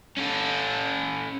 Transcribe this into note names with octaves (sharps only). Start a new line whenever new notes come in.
C#4 A4